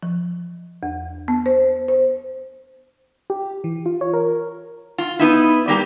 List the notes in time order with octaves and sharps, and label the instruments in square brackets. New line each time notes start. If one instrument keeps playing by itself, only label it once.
[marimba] F3
E2
B3
C5
C5
[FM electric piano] G4
E3
F4
C#5
A#4
[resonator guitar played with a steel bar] F4
B3 D#4 E4
G3 A#3 G4